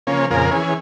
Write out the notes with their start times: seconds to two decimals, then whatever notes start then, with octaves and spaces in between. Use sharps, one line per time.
0.07 C#3 F3 A#3 C#4
0.31 F2 A#2 C#3 G#4 A#4
0.51 E3 C#4 G#4